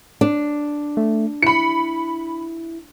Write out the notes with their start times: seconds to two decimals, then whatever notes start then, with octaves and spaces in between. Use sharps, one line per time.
0.21 D4
0.97 A3
1.42 E4 B5 C#7